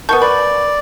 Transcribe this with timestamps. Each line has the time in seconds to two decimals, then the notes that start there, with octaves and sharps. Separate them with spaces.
0.09 B3 F#4 A#4 A5 C#6 G6
0.22 B4 D5